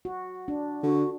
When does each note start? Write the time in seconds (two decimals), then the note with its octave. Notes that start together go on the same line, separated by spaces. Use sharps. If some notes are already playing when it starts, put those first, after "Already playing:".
0.05 F#4
0.48 D4
0.83 D3 F#4